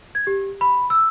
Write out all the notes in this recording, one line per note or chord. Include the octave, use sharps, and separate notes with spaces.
G#6
G4
B5
E6